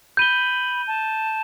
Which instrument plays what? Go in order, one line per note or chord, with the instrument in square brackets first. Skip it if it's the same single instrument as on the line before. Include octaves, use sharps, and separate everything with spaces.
[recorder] B5 [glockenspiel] G6 D#7 G7
[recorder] A5